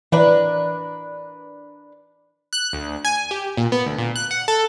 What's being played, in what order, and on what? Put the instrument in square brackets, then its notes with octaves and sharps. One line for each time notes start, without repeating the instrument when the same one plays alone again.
[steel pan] E3 [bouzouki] D4 A#4 B4
[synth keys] F#6
D2
G#5
G4
A#2
B3
D2
A#2
F#6
F#5
A4